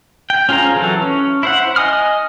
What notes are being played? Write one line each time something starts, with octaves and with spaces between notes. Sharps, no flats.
G5
C#4 F4 G#4 C5 A#5
E3 F#3 A4
C#4
E4 C5 F#5
D#5 G#5 D#6 F6